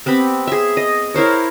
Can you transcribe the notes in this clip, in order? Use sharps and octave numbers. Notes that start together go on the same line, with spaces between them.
B3 C4 G4 B5
G#4 E5
D#5
E4 A#4 C5 C#5